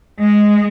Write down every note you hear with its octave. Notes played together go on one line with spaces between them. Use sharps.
G#3